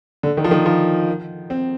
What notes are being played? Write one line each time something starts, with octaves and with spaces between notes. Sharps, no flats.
D3
D#3
F3
D#3
F3
C4